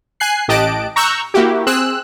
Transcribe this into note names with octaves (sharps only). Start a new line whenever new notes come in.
G#5 F#6 C7
A1 G4 D#5 A5 F#6 D7
A#5 C#6 E6 F#6 G6
A#3 E4 F#4 G4
C4 G#4 E6 F#6